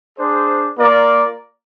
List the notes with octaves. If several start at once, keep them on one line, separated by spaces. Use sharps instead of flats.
D4 G#4 C5
A#3 F4 A#4 D5